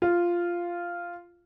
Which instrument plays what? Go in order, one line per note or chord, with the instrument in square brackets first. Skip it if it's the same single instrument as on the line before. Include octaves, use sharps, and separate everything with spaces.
[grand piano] F4